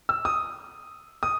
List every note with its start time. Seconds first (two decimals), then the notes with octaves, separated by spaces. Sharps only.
0.09 E6
0.25 D#6
1.23 D#6